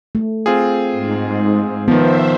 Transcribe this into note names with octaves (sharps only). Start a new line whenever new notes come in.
A3
C4 F4 G#4
G#2
D#3 F3 B3 C5 E5